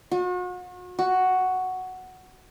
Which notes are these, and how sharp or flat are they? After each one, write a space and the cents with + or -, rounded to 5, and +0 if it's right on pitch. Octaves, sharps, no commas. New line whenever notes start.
F#4 -40
F#4 +5